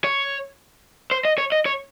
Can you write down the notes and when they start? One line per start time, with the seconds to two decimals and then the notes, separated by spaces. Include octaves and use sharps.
0.04 C#5
1.11 C5
1.25 D#5
1.38 C#5
1.52 D#5
1.66 C#5